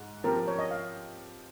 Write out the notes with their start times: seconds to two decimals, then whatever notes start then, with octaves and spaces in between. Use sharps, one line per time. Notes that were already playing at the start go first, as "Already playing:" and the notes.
Already playing: G#2
0.24 F3 C4 G4 A#4
0.36 A#4
0.48 C#5
0.59 D#5
0.71 F5